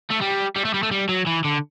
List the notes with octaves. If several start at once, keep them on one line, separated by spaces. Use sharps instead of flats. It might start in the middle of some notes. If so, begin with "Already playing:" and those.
A3
G3
G3
A3
G3
A3
G3
F#3
E3
D3